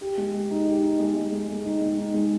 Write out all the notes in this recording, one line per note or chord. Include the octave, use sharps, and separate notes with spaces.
G4
G#3
G4
D#4
G4
D#4
G#3
G#3
G#3
G#3
D#4
G#3
D#4
G#3